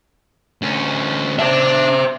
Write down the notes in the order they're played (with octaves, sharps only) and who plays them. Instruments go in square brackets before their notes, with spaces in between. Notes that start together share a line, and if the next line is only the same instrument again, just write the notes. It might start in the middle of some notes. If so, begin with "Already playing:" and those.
[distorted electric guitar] D2 C#4
[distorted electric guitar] D4 [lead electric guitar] C5 E5